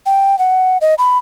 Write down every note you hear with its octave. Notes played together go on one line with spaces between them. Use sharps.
G5
F#5
D#5
B5